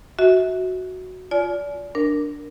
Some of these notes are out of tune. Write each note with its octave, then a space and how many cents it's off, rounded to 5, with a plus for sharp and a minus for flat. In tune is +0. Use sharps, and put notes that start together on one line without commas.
F#4 +0 E5 -30
F4 +10 D5 -30 G#5 +40
D4 +0 A#4 +0